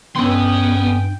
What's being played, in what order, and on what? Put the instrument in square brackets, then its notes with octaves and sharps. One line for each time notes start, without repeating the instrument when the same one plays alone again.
[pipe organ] G2 [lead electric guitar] B3 [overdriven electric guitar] C#4 C6 [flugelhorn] G5